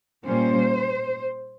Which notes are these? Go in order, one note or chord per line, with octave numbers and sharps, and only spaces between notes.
A#2 G3 A#3 C#4 C5